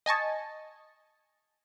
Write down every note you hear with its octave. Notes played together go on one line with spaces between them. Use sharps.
D#5 G#5 A5 C#6